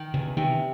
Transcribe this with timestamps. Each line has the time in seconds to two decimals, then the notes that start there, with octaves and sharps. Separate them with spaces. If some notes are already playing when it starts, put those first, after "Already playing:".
Already playing: D#3
0.14 E2 C#3
0.37 C3 D#3